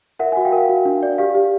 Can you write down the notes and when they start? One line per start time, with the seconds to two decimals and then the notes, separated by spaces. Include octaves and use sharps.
0.19 A#4 E5 F#5
0.32 F#5 G#5
0.37 F#4
0.45 F5 G5
0.52 A#4
0.58 F5
0.69 F#4
0.85 D4
1.03 D5
1.18 G4 F5
1.35 G4